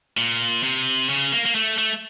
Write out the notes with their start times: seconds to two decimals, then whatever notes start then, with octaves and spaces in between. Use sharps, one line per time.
0.17 A#2
0.63 C3
1.09 C#3
1.32 A#3
1.46 A#3
1.55 A3
1.78 A3